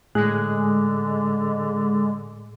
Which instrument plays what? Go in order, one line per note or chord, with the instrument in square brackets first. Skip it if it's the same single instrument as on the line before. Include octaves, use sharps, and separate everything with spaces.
[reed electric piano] A2 G#4 F#6 [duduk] D3 [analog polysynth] G#3